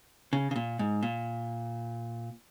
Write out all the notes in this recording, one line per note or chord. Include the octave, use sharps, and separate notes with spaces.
C#3
C#3
A#2
G#2
A#2